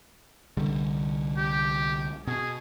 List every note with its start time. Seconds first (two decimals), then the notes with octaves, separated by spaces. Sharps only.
0.57 C2 D3 G3
1.38 G4
2.27 B2 G#4